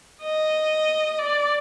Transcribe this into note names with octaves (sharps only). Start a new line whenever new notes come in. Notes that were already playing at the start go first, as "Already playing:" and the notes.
D#5
D5